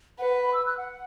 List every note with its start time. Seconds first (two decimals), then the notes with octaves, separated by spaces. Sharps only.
0.19 B4 F#5
0.31 F#5
0.42 B5
0.54 E6
0.66 F#6
0.77 F#5